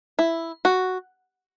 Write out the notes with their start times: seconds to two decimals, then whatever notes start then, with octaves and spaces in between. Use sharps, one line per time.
0.19 E4
0.65 F#4